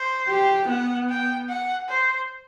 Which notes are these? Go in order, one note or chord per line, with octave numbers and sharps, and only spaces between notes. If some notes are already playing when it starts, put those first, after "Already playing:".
Already playing: C5
G4
B3 F#5
G5
F#5
C5